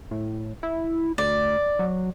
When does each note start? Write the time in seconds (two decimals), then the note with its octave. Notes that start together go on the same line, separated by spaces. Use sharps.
0.11 A2
0.63 E4
1.18 D2 D5
1.79 F#3